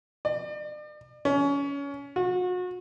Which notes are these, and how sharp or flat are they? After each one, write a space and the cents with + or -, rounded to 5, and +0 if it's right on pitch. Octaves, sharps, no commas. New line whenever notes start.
D5 +40
C#4 +25
F#4 -35